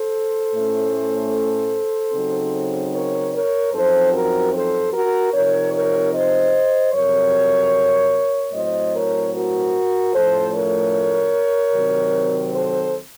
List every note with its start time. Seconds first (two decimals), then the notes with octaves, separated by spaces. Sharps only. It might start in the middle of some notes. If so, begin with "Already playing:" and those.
Already playing: A4 C5
0.53 A2 A3 C#4
2.13 C#3 F#3 C4 D#4
2.93 A#4 C#5
3.33 A#4 C#5
3.73 F#2 F3 C4 D#4 A4 C5
4.13 F#4 A#4
4.53 A4 C5
4.93 F#4 A#4
5.33 C3 F3 C4 D#4 A#4 C#5
5.73 A#4 C#5
6.13 C5 D#5
6.93 F2 C3 F#3 A#4 C#5
8.53 A2 F#3 C4 C5 D#5
8.94 A#4 C#5
9.34 F#4 A#4
10.14 A2 F3 A3 C#4 A4 C5
10.54 A#4 C#5
11.73 C3 D#3 F#3 C4
12.54 A4 C5